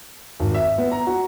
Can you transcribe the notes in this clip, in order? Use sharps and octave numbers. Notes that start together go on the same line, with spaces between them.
G#1
E5
B3
A#5
F#4